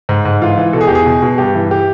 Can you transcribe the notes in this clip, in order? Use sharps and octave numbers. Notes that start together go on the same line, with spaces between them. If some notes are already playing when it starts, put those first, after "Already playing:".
G#2
G#2
E3 F4
E3
B2 A4
G#4
E2 G4
G#4
B2
B2
G2 G4
E3
G4